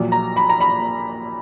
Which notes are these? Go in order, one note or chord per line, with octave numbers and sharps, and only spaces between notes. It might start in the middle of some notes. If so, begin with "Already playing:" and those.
Already playing: A#1 A#2 F#3
A#5
B5
A#5
B5